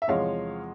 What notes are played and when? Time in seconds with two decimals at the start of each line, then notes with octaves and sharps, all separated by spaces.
0.02 E5
0.08 E2 C3 F3 G#3 C#5 F5